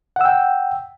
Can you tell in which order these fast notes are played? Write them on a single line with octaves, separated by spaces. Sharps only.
F#5 E6 G5